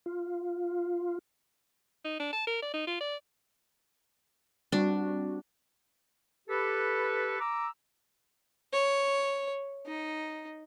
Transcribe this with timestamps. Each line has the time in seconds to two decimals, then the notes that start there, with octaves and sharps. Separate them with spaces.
0.06 F4
2.05 D#4
2.20 D4
2.33 A5
2.47 A#4
2.62 D5
2.74 D#4
2.87 F4
3.01 D5
4.72 G3 C4 D4 F#4
6.48 G4 A4 B4
7.40 A#5 D6 E6
8.73 C#5
9.86 D#4